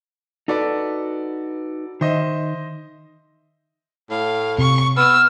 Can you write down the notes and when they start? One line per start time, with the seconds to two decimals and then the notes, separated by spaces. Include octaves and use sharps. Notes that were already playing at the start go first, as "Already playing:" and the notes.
0.48 D#4 F#4 A4 B4 D5
2.01 D#3 C5 D#5 E5
4.10 A2 F5
4.58 C3 C#6
4.97 B3 E6 F6